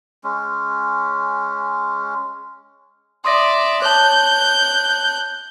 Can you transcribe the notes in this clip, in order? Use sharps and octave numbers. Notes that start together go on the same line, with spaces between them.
G#3 C#4
D5 E5 C6 D#6 A#6
C#5 A5 F#6 G6